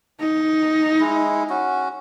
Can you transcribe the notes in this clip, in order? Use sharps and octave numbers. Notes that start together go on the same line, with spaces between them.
D#4
G#3 E4
C#4 F#4